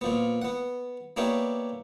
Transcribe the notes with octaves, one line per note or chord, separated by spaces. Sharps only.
A#2 F3 B3
B3 F#5
A#3 B3 D4 G4 C#5 E5